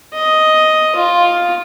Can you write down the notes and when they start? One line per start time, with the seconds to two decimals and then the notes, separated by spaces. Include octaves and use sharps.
0.15 D#5
0.96 F4